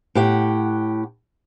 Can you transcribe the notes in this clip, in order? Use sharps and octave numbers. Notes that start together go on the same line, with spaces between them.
A2 G4 F#5